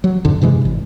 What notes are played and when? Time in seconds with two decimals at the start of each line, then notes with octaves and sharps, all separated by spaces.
0.04 F#3
0.25 F2 G#2 D3
0.42 G2 C3 E3 G#3
0.65 G#1